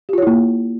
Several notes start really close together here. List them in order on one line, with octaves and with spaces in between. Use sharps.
G4 F4 C#5 E4 A#3